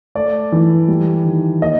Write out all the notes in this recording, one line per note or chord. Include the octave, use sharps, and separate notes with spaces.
A3 D5
E3
G3
D#3
A#3 D#5